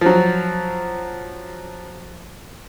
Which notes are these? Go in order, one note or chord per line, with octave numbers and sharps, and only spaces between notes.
F3 F#3